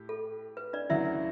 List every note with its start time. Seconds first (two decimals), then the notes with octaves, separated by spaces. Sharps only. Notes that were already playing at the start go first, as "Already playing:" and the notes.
Already playing: A2 G4
0.09 A4
0.57 B4
0.73 D4 D5
0.89 D2 C#3 F#3 E4 E5